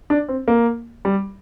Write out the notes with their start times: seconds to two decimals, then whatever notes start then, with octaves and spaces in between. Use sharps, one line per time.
0.10 D4
0.28 C4
0.48 A#3
1.05 G3